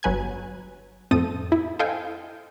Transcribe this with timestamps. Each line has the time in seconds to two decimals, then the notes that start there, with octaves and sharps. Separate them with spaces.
0.03 G1 F#3 B4 G#5 F#6 G#6
1.11 F2 A2 C4 A4 D#6 D#7
1.52 E4
1.79 A4 C5 D#5 F5 G5 G#5